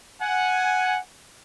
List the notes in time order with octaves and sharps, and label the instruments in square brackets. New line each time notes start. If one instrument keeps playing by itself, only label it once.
[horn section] F#5 G#5